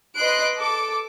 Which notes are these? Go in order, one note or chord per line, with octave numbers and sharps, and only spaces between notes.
B4 D#5 C6 F#6 D7
A4 D6